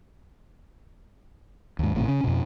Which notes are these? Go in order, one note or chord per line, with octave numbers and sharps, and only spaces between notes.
D#2 G#2
G#1 A2 C3
C#3 C#4
F2 B2